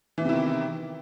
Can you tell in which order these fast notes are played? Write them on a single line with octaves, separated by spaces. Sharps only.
E3 B3 C3 E4 D#3